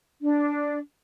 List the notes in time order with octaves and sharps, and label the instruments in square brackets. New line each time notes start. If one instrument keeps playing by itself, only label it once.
[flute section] D4